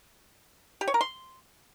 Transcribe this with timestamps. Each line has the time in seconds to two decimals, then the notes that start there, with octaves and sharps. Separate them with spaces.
0.81 G4
0.88 C#5
0.94 A#4
1.01 C6